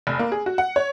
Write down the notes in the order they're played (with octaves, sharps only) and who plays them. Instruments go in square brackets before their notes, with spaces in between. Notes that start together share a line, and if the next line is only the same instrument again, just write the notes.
[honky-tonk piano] F1
A#3
G#4
F#4
F#5
C#5